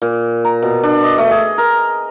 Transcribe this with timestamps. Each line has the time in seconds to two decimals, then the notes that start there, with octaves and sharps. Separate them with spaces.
0.02 A#2
0.45 A#5
0.62 B2
0.83 D4
1.04 D#5
1.18 A3
1.31 G#4
1.58 A#4